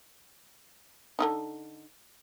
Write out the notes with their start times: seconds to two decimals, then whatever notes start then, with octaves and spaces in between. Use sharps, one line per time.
1.19 D3 D4 D#4